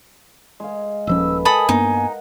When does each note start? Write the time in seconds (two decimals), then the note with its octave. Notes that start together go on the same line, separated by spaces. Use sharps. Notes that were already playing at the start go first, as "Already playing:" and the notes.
0.60 G#3 F5
1.07 D#1 F3 C#4 A4 B4 E6
1.45 A4 A#4 D#5 G#5 B5 D#6
1.69 G2 A#3 B3 D#4
1.97 F#5